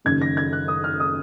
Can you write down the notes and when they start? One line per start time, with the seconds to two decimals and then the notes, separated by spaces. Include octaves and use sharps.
0.05 F#1 F#2 D#3 G#6
0.21 A#6
0.37 G#6
0.53 F#6
0.68 D#6
0.84 F6
1.00 D#6